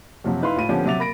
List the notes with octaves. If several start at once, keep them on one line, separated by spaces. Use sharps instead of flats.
F#2 C3 F3 F#3
D#4 E4 B4 F5 C6
A2 F4 B5 D#7
D3 F3 B3 C#4 G4
C3 F#3 E5 D6 A6 F7
A#3 B5 A#6 D7